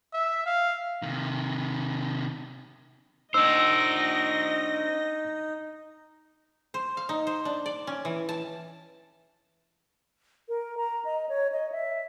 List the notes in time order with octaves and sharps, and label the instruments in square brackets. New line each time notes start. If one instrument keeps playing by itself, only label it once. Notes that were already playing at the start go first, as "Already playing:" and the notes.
[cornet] E5
F5
[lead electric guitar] C3 D#3
[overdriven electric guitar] D4 C5 [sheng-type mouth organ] D#4 [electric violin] D#5 A#6 [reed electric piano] E6
[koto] C5
F5
D#4
C5
D4
D5
C#4
E3
A5
[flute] A#4
A#5
D#5
C#5
D#5
E5